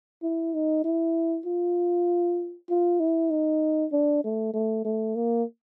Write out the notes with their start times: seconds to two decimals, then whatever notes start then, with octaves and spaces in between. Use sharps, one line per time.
0.23 E4
0.54 D#4
0.84 E4
1.45 F4
2.69 F4
3.00 E4
3.30 D#4
3.92 D4
4.24 A3
4.54 A3
4.84 A3
5.15 A#3